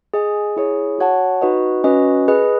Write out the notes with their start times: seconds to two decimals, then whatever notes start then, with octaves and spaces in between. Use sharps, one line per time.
0.14 G#4 D#5 G#5
0.56 E4 G#4 C#5
0.98 F#4 C#5 F#5 A5
1.41 D#4 F#4 B4 D#5
1.84 C#4 F#4 B4 D#5
2.28 G#4 B4 D#5